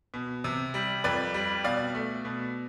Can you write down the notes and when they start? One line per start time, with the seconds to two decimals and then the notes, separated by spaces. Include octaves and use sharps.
0.14 B2
0.44 C3
0.74 G3
1.04 F2 B4 D5
1.34 G3
1.64 B2 D5 F5
1.95 A3
2.25 B2